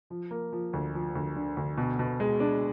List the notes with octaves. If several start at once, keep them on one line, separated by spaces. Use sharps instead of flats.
F3
A#3
F3
D2
F3
D2
D3
D2
B2
B2
G#3
D4